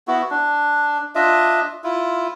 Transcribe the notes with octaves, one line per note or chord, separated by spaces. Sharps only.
B3 E4 F#4
D4
D4 F4 D#5 E5
E4 F4